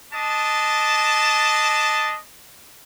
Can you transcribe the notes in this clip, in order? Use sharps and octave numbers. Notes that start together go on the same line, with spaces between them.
D4 D#5 A5